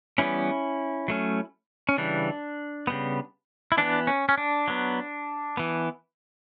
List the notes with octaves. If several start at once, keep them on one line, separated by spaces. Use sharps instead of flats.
E3 G3 B3 C#4 E4
F#3 A3 C#4
C#4
C#3 E3 G3 D4
C#3 G3 B3
E4
E3 B3 D4
C#4
C#4
D4
F#3 B3
E3 B3